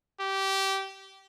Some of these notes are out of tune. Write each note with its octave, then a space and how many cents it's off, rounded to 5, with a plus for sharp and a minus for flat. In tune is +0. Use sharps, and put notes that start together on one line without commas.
G4 -20